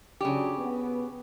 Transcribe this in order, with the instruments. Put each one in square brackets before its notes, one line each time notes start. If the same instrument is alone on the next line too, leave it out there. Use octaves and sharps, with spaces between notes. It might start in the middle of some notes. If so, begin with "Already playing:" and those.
[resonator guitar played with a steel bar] C#3 G4 [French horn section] F#3 D4
[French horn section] B3